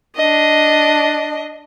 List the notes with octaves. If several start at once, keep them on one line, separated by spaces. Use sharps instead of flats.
D4 D#5